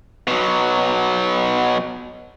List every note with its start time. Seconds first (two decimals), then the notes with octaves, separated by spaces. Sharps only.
0.28 B2 F#3